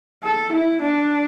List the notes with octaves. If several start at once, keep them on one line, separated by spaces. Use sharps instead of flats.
A4
E4
D4